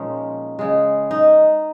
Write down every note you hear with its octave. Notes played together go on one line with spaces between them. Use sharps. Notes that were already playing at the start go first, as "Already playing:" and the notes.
Already playing: A#2 F3 G#3 C#4 D#4
C#3 G#3
D#4